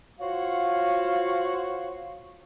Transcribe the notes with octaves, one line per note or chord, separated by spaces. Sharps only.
F4 F#4 C5 C#5 F5